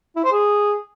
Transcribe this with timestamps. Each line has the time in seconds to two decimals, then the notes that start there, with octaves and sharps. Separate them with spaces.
0.16 E4
0.24 C5
0.32 G#4